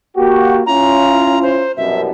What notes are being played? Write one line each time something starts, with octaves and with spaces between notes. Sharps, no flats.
A#3 F#4 G4
C#4 E4 F4 A#5
C5
C2 F#2 B2 E5